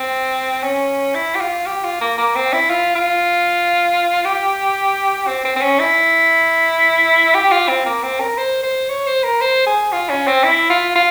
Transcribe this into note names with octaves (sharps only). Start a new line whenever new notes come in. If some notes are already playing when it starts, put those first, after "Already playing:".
Already playing: C4
C#4
E4
G4
F4
G4
F4
A#3
A#3
C4
E4
F4
F4
G4
C4
C4
C4
C#4
E4
G4
F4
C4
A#3
C4
A#4
C5
C5
C#5
C5
A#4
C5
G#4
F4
C#4
C4
E4
F4
F4